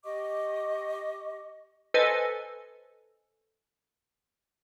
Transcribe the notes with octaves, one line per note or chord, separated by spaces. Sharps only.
G4 D#5 C#6 D6
A4 B4 C5 D#5 G#5